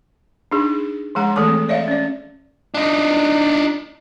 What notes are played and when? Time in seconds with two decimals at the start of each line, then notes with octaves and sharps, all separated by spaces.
0.52 D4 D#4 G#4
1.15 F3 G#3 G#4 F#5 A#5
1.36 E3 A3 A4 A5 D6
1.48 C4
1.69 C#5 D5 E5 F5
1.88 C#4 D5
2.74 D4 D#4